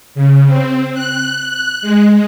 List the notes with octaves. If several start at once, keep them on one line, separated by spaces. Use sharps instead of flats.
C#3
C4
F#6
F#6
G#3